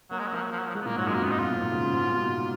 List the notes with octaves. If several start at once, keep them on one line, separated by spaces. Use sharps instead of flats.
F#3 A#3
G#3
F#3
F3 A#3
F#3
F3
F#3
F3
F#3 G#3
B3
A#2 A#3
G#2 F#3
F#2 G#3
A#3
F2
B3
G#2
D#4
B2 F4
A#2
G#2
C#3
C#3
G#2
A#2
B2
G#2